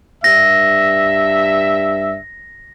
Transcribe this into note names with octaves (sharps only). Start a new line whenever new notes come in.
G2 E5 A#6